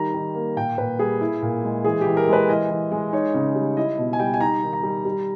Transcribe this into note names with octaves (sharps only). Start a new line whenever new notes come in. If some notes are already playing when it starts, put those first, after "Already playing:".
Already playing: D#3 G3 A#5
D#3
A#3
A#2 G5
A#2 B4
G3 G#4
E4
A#2
G#3
E3 G#4
G4
E3
A#4
G#3 B4
E3 D#5
E3
G#3
D#4 C#5
C#3
G3
E4 D#5
B2
G#5
G3 G5
G#5
D#4 A#5
D#3
A#5
G3
G3